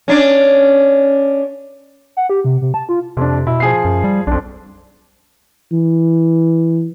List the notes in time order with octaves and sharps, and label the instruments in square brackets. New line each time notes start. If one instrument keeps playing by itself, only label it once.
[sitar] C#4 D4
[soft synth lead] F#5
G4
C3
C3
A5
F4
[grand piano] F2 D4 [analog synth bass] C3
[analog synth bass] B2 [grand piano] E4
[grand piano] F3 G#4 C7
[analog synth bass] F#2
G3
[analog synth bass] B1 [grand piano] F2 D4
[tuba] E3